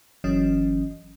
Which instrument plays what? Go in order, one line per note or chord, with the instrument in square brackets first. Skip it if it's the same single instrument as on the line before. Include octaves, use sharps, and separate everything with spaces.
[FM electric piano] G1 E3 F#3 C#4 D#5